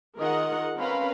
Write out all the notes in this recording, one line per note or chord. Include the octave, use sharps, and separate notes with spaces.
D#3 F4 G#4 A#4 D#5 F#5
C4 C#4 A#4 B4 F5 B5